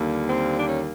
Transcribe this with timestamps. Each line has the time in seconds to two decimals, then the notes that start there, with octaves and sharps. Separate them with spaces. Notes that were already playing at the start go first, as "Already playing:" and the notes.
Already playing: D#2 D3 G3 A#3
0.28 C4
0.59 D4
0.67 C#4